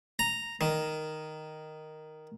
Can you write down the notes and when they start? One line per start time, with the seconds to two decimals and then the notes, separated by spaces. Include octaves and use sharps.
0.19 A#5
0.61 D#3